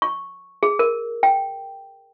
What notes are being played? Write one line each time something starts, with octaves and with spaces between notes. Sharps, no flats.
C#6
G#4
A#4
G5